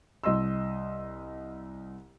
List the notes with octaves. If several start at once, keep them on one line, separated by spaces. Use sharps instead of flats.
C2 D#5 C6 E6